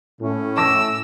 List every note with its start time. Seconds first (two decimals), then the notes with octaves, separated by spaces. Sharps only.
0.21 A2 C#4
0.57 A5 D6 E6 A#6